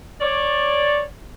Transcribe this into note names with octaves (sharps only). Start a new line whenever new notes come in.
C#5 D5